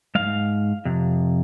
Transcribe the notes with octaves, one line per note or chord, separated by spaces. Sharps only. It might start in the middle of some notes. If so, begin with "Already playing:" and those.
G#2 G#3 F5
F2 C3